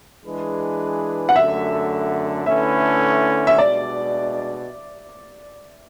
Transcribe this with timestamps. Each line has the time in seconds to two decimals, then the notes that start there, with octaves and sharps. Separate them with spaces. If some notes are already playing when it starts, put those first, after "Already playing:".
0.24 E3 G#3 D4 G#4 B4
1.29 F#5
1.36 F#2 D3 A3 E5
2.46 D3 A3 C#4 E4 B4 E5
3.47 E5
3.58 B2 G#3 D4 D5